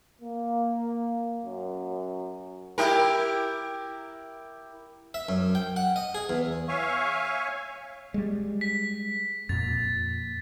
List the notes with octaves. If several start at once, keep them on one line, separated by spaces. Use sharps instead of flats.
A#3
F#2
E4 G4 A#4
E5
F#2
G5
F#5
D#5
G#4
E2
C#5 E5 F5 G#5 C#6
G3 G#3
B6
F2 A#2 A6